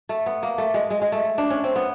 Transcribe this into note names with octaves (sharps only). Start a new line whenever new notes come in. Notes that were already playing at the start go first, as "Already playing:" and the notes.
A3
B3
A#3
A3
G#3
G#3
G#3
A3
D4
C#4
C4
B3